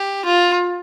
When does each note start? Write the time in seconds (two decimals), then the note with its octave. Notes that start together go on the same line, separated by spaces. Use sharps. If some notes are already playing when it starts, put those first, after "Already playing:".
Already playing: G4
0.25 F4